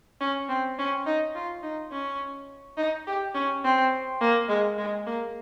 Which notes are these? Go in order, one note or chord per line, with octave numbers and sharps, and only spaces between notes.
C#4
C4
C#4
D#4
F4
D#4
C#4
D#4
G4
C#4
C4
A#3
G#3
G#3
A#3